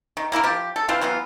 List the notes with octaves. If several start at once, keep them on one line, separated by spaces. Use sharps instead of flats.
D#3
A#3 E4 F4 A#4
F3 G4
A4
E3 C4 F4 C5
E3 F#3 B3 F4